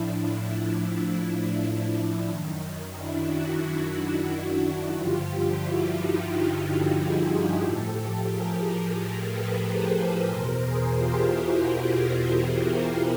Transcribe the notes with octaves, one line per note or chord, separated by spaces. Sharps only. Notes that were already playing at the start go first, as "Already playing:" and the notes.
Already playing: A2 F3 D4 E4
D4 E4
F#2 D#3
D4 E4
E4 F#4
E4 F#4
G2 D3 F3 F4 G4
E4 F#4
D#4 F4
E4 F#4
F4 G4
F#4 G#4
A2 F3 G4 A4
G#4 A#4
A4 B4
A#4 C5
E2 B2 A#4 C5
G#4 A#4
F4 G4
E4 F#4
F4 G4
F#4 G#4